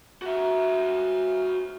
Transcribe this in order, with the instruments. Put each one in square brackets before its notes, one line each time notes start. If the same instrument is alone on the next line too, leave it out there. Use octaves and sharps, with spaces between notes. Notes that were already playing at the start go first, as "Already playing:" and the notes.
[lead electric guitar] F#4 E5